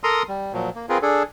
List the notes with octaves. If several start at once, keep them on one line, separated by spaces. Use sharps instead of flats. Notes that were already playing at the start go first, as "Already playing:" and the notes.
A4 A#4 A#5 C6 D#6
G3
A#2 F3 F#3
A#3
C4 F4 G#4 A#4 B4
D4 G#4 A4